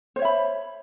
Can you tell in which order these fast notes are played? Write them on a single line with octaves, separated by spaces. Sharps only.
C5 C#5 E5 B5